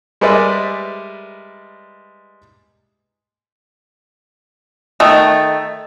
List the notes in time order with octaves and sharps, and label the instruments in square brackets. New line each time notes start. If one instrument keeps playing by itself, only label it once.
[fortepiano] G3 G#3 A#4 B4 D5 E5
[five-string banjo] D#3 A3